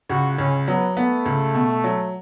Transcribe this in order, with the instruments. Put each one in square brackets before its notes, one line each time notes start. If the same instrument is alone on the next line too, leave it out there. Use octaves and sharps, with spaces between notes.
[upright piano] C#2 [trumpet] F#4
[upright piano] C#2 [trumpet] C#4
[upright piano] F#3 [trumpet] B3
[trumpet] A3 [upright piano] B3
[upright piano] C#2
B2
F#3